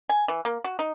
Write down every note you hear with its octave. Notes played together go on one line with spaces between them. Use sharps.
G#5
E3
A#3
F#4
D#4